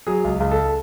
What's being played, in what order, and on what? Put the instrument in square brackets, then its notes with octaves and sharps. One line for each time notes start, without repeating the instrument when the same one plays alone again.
[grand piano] F#3 G#4
C#2
C#2
A4